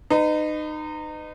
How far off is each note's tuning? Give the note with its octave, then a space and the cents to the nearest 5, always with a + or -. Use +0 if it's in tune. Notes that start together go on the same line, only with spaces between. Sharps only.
D#4 -25 B4 +30